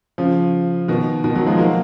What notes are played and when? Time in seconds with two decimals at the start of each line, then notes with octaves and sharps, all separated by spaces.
0.18 C#3 F3
0.88 B2 D#3
1.24 B2 D#3
1.35 D#3 F#3
1.46 F3 G#3
1.58 F#3 A#3